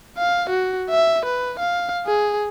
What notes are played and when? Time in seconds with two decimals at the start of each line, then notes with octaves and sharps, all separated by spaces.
0.17 F5
0.50 F#4
0.90 E5
1.25 B4
1.59 F5
2.06 G#4